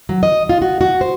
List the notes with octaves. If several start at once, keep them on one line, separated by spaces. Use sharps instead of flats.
F#3
D#5
F4
F#4
F#4
C5